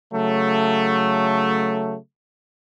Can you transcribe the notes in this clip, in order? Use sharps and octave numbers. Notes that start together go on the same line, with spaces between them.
C#3 F#3 A3